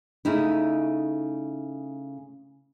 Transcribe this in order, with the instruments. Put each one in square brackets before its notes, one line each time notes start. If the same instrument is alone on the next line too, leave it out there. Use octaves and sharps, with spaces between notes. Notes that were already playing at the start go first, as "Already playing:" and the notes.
[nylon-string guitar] C#3 A3 D#4 E4